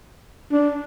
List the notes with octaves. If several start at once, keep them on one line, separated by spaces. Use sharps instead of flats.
D4